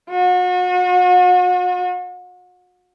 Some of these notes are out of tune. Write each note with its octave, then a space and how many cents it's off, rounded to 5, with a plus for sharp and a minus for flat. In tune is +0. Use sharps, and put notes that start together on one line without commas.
F#4 -40